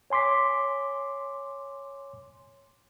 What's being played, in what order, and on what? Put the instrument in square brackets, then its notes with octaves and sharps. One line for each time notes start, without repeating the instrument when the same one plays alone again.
[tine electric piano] C#5 G#5 C6 D6 B6